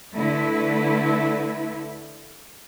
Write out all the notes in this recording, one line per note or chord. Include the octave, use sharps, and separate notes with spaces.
D3 A3 E4 B4